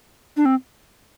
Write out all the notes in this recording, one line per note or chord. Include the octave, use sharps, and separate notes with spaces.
D4
C4